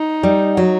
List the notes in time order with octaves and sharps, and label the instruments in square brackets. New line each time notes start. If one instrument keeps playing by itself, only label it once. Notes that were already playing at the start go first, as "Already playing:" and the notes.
Already playing: [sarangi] D#4
[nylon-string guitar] G3
F#3